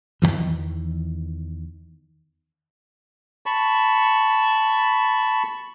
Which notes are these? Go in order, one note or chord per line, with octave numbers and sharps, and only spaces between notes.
E2 C3 D#3 E3
A5 B5 C#6